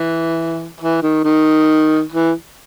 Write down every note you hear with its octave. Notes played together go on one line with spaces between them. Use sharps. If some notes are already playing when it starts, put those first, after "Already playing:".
Already playing: E3
E3
D#3
D#3
E3